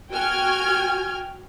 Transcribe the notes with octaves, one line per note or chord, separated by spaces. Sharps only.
F#4 G5 G#5 F6 G#6